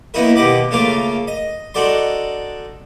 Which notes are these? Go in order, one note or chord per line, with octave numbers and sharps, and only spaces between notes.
A#3 B3 C#4 D#4 E4 A#4
D#2 B2 G4 D#5 F#5 D6
C#3 A3 A#3 F4 F5 D6
D#5
D4 D#4 F#4 A4 D5 C6